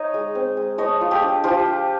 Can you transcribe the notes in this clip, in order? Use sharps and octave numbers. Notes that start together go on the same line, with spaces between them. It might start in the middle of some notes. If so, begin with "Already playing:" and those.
Already playing: D#4 C#5 D#5
G#3
C4
G#3
A3 C#5 D#5
F4
G4 A4
D4
F3 F4 G4
A3